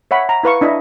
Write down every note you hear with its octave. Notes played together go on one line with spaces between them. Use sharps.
C#5 E5 F#5 B5
A#5
E4 B4 F5 C#6
D4 E4 D#5 E5